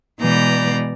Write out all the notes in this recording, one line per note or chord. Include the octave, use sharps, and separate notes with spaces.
B2 E3 G#3 D5 A#5 G6